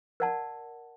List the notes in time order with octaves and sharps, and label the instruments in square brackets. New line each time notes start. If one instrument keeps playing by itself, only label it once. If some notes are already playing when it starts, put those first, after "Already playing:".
[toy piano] A#4 D5 F#5 A5